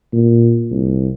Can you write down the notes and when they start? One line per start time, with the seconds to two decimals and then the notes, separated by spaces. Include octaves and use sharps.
0.13 A#2
0.71 C2